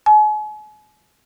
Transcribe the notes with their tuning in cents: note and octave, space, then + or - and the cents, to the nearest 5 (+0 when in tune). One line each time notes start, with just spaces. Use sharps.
G#5 +40